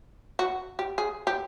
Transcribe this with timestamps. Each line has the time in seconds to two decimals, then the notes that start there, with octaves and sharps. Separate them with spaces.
0.39 F#4
0.79 G4
0.98 G#4
1.27 G4